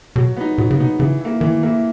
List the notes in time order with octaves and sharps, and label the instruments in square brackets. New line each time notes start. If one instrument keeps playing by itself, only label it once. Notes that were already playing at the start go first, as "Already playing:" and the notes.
[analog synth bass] B2 [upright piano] F#3
[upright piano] B3 D#4
[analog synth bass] A#2 [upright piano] F#3
[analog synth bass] C#3
[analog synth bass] B2 [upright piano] B3 D#4
[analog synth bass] C#3 [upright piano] E3
[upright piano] A#3 E4
[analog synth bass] D#3 [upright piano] E3
[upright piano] A#3 E4